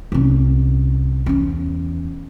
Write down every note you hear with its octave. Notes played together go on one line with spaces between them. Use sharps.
C2 C#4
E2 C#4